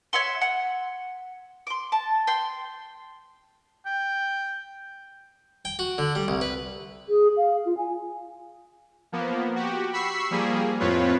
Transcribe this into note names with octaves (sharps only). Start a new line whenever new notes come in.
C#5 E5 F#5 C6
F#5
C6 D6
A5
G5 C6
G5
G5
F#4
D3
G3
C2
B4
G#4
F5
F4
G#5
F3 A#3 B3
F#4 G4
B5 C#6 E6 B6 C7
F3 G3 A#3 G#4
F2 A2 C4 F4 B4 C#5